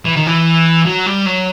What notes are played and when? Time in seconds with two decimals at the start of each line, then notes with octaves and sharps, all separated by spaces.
0.05 E3
0.17 D#3
0.27 E3
0.86 F#3
1.06 G3
1.26 F#3